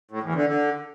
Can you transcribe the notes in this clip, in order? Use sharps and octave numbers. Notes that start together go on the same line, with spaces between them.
A2
E2
D3
D3